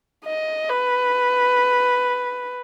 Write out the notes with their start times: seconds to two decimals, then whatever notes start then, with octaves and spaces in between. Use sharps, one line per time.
0.25 D#5
0.69 B4